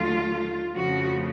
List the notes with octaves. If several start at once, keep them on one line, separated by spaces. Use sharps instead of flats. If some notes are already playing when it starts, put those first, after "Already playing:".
Already playing: D#2 D3 F#3 A3 F4
F2 C#3 F3 A3 F#4